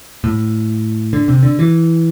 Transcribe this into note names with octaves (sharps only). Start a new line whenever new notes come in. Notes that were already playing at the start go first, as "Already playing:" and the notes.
A2
D3
C3
D3
E3